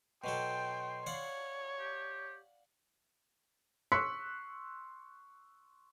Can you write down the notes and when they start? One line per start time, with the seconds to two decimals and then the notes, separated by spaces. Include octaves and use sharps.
0.24 B2 F#3 A4 G5 C6
1.06 C#5 D5 F5 F#5
1.80 G4
3.92 C6 C#6 E6 F#6 B6 C#7